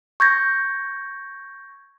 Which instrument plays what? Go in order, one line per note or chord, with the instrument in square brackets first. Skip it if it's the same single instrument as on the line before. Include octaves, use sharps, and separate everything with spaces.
[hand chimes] C#6 G6 G#6 A#6